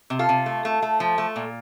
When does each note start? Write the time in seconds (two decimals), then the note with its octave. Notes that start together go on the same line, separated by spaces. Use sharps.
0.10 C3
0.19 F4 A4
0.29 C3
0.46 A3
0.65 A3
0.82 A3
1.00 F3
1.18 A3
1.36 A#2